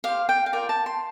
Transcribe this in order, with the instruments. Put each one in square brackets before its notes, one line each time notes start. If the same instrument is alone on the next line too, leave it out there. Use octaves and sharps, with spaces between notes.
[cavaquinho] G4 C5 F5
G5
F5
F4 A#4 D5 G5
A5
C6